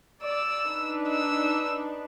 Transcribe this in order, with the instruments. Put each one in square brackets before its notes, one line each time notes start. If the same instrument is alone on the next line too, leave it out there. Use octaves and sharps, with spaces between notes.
[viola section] D5 [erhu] E6
[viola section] D4 D#4 B4
[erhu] E6